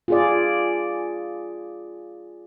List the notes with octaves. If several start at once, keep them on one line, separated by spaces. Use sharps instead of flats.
F4 G#4 D5